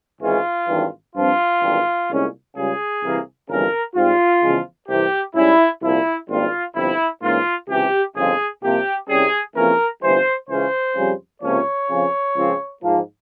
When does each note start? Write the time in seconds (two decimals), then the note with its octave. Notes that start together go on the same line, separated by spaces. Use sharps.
0.22 G#1 G#2 E3 G#3 C#4 F4
0.69 G#1 G2 E3
1.15 G2 F3 C4 F4
1.62 G#1 G2 E3
2.09 C2 A#2 G#3 C#4
2.55 C#2 C#3 G3 G#4
3.02 C2 C3 E3 A#3
3.49 G1 F2 C#3 E3 G3 A#4
3.96 G#2 G3 C4 F4
4.42 E2 C#3 F3 G#3
4.88 C2 C3 E3 G4
5.35 G#2 G3 C#4 E4
5.82 C2 A#2 F3 E4
6.29 G#1 G2 G3 A#3 F4
6.75 G1 F2 C3 F3 E4
7.22 G#2 E3 A#3 C#4 F4
7.69 C#2 C3 E3 G4
8.15 G1 F2 C#3 F3 C4 G#4
8.62 C2 C3 F3 A#3 G4
9.09 C2 C3 G3 C#4 G#4
9.56 F2 C#3 E3 A#3 C#4 A#4
10.02 G1 F2 E3 G3 C5
10.49 C#2 C#3 E3 G#3 C#4 C5
10.96 F2 C#3 G3
11.42 C#2 C3 F3 A#3 C#4 C#5
11.89 F2 C#3 F3
12.36 C#2 C#3 F3 C4
12.83 G#2 F3 A#3